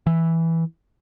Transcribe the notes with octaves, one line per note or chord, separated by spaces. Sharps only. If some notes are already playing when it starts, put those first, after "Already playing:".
E3